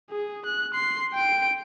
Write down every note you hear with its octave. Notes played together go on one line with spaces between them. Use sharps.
G#4
F#6
C6 C7
G5 D7